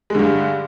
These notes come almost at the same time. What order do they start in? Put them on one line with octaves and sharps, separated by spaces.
G#3 D3 G2